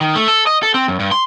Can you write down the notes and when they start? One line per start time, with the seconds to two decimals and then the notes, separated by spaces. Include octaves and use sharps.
0.01 D#3
0.16 A3
0.28 A4
0.47 D#5
0.63 A4
0.74 C4
0.88 F#2
1.00 G2
1.12 C6